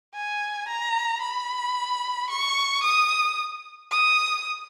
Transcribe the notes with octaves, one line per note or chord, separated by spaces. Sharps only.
G#5
A#5
B5
C#6
D#6
D#6